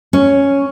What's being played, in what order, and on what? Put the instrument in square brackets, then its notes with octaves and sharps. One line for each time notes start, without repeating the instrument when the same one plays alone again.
[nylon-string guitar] C#4